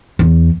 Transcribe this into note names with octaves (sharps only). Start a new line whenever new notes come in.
E2